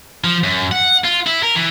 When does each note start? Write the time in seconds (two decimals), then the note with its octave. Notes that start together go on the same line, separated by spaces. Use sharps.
0.24 F3
0.44 F#2
0.71 F#5
1.04 F4
1.26 E4
1.43 A#4
1.55 E3